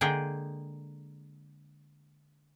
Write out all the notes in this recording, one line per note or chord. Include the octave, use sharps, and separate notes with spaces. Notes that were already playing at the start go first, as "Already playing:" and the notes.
D3 G#3 A#3 G#4 G5